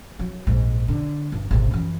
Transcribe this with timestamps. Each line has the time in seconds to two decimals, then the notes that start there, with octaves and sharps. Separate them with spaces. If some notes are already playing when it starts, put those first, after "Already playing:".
0.19 F#3
0.47 A#1 G#2
0.88 D3
1.32 G1
1.51 G#1 C3
1.71 F#2 E3